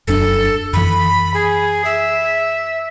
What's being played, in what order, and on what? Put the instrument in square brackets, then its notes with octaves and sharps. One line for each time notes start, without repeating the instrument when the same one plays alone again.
[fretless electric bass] F1 F#2 D4 [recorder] A4
[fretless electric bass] F#2 E3 [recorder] B5
[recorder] G#4
E5